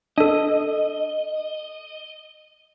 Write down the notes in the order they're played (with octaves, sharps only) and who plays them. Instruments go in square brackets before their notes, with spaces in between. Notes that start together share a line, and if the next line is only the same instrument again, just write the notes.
[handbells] D4 A4 [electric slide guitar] D#5